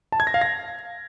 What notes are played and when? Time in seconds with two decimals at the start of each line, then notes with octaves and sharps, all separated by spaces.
0.12 A5
0.20 G#6
0.27 A#6
0.34 F5
0.41 A#6